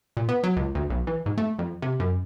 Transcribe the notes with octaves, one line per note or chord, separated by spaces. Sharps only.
A#2
B3
F#3
C#2
D2
B1
E3
G#2
A3
F2
C3
F#2